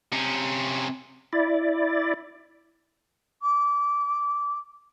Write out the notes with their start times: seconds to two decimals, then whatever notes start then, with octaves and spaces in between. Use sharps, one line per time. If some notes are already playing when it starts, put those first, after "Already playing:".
0.12 C3 C#4
1.33 E4 D5
3.42 D6